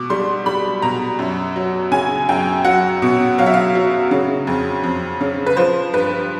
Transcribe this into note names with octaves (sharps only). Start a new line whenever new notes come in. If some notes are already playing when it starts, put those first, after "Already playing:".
Already playing: B2 D6
G3 C6
G3 B5
B2 A#5
F#2
F#3
C#3 G#5
F#2 G5
F#3 F#5
B2
F#3 F5
E5
F5
F#3
C#3
F2
F2
C#3
B4
F3 C5
G2 B4